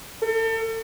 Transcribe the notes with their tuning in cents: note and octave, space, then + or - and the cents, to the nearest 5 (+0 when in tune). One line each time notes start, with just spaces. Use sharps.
A4 +40